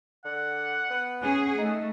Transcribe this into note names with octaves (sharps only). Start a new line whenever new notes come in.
D3 F#5
B3
C#4 G#4 F#5
A3 D#4